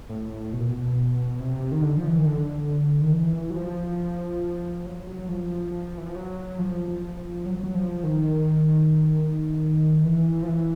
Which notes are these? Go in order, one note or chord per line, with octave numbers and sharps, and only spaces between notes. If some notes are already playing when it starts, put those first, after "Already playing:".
A2
B2
A#2
B2
C3
D#3
D3
F3
E3
D#3
D3
D#3
E3
F#3
F3
F#3
F#3
F#3
F3
F3
E3
F3
F#3
F3
F3
F3
F#3
F#3
F3
D#3
E3
F3
E3